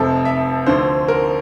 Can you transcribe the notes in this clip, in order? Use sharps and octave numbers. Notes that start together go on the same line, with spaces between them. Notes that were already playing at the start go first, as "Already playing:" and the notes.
Already playing: F1 F2 C3 F3 A4
E5
D2 D3 F3 C5
A#4